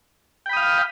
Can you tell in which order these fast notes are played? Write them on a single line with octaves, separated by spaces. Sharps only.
G5 B5 D#6 F5